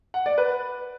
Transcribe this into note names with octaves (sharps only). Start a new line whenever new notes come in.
F#5
D5
B4